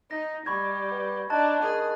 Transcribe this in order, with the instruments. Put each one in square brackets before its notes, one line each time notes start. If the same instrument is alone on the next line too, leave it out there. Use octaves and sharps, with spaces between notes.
[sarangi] D#4 [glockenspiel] A#6
[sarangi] G3 [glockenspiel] B5 C#6 G#6
[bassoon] B3
[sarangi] D4 [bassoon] D#4 [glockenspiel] A5 F#6 A6
[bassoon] D#3 [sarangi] G#4